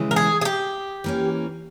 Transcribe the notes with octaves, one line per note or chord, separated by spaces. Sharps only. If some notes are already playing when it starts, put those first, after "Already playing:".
Already playing: C#3 E3 G#3
A#4
G#4
G#4
G4
E3 A#3 C#4